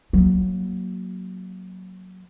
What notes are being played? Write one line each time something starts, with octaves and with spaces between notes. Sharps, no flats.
F#3 A#3